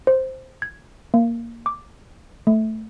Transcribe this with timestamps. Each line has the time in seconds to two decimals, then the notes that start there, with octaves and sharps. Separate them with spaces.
0.07 C5
0.62 G#6
1.14 A#3
1.66 D6
2.47 A3